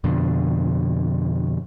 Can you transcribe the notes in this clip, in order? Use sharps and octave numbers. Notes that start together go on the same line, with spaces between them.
F2 B2 D3